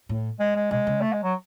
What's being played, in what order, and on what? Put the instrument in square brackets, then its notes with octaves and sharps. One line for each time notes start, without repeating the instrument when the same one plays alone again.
[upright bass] A2
[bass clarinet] G#3
G#3
[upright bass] B2 [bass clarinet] G#3
[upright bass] C#3
[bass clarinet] A3
G#3
F#3